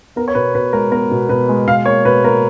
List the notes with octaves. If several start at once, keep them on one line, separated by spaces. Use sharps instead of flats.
B3 A#4
C#5
B2 B4
B2 B4
G#3 A#4
B3 A#4
B2
B2 B4
G#3
B2 F5
A#3 C#5
B2 B4
A#3 A#4